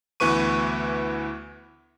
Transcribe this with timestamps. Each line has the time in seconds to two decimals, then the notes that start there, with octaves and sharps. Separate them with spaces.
0.20 D2 E3 B3 B4 C#6 D#7